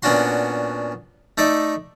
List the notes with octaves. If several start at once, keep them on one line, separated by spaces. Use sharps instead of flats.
A#2 B3 C#4 D4 F#4 C6
A3 D#4 D5 E5